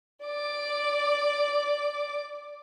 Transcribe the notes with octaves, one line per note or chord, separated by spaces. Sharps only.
D5 D6